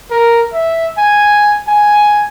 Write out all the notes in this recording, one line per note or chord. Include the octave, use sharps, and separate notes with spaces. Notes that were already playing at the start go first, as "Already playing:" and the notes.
A#4
E5
G#5
G#5